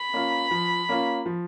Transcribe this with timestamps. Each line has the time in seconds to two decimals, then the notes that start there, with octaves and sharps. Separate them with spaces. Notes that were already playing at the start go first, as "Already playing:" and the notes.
Already playing: B5
0.13 A#3 C#4 F4
0.51 F3
0.89 A#3 C#4 F4
1.26 F3